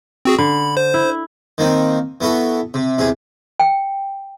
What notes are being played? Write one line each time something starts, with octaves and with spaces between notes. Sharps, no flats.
C4 F#4 G#4
D3 B5
C5
E4
D#3 A#3 C4 D#4
E3 B3 F#4 A4
C3
E2 C3 G#4
G5